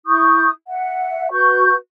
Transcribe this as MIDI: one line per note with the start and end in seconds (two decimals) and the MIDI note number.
0.07 0.49 64
0.07 0.49 85
0.07 0.49 87
0.07 0.49 91
0.68 1.28 76
0.68 1.28 78
1.31 1.74 66
1.31 1.74 71
1.31 1.74 85
1.31 1.74 91